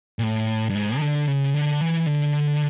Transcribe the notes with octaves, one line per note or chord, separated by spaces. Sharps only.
A#2
A2
G2
G#2
D#3
D3
C#3
D3
E3
D3